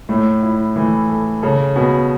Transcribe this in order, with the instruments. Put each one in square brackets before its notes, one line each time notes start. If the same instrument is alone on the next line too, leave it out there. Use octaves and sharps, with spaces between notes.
[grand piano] A2 [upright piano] A3
[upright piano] E4
[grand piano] E3 [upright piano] A3
[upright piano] A4
[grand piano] C#3 [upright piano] A4
[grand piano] B2 [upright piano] B3